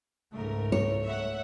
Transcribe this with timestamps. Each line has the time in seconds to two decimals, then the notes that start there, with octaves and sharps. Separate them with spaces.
0.32 C#2 G#2 A3 A#4
0.72 C#5
1.06 E5 F#5